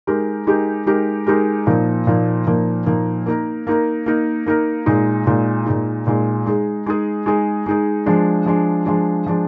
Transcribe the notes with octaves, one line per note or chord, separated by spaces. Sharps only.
G#3 D#4 G4 A#4
G#3 D#4 G4 A#4
G#3 D#4 G4 A#4
G#3 D#4 G4 A#4
A#2 F3 A#3 D#4
A#2 F3 A#3 D#4
A#2 F3 A#3 D#4
A#2 F3 A#3 D#4
A#3 D#4 A#4
A#3 D#4 A#4
A#3 D#4 A#4
A#3 D#4 A#4
A#2 G#3 D#4
A#2 G#3 D#4
A#2 G#3 D#4
A#2 G#3 D#4
G#3 D#4 G#4
G#3 D#4 G#4
G#3 D#4 G#4
G#3 D#4 G#4
F3 G#3 D4
F3 G#3 D4
F3 G#3 D4
F3 G#3 D4